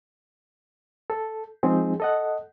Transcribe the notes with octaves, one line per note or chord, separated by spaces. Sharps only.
A4
F3 G#3 C4 D#4 G#4
A4 D#5 F#5